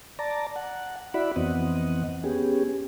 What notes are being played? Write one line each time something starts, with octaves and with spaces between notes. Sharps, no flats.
D5 A5 A#5
F#5
E4 F#4 D5 E5 F#5 B5
F2 E3 B3 C4 D#5 F#5
B3 C#4 G4 G#4